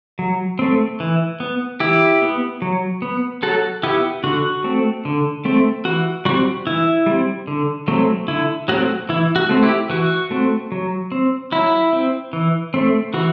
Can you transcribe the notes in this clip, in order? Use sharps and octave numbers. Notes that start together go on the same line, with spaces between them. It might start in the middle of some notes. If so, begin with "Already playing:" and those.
F#3
A3 C4
E3
B3
E3 E4 G4
B3
F#3
B3
F#3 F#4 A4
B3 E4 G4
D3 F#4
A3 C4
D3
A3 C4
E3 F#4
G3 C4 F#4
E3 E4
G3 C4
D3
F#3 A3 C4
D3 E4
F#3 A3 C4 F#4
E3 E4
F#4
A3 C4
E4 G4
E3 F#4
A3 C4
F#3
C4
F#3 E4
C4
E3
A3 C4
E3 F#4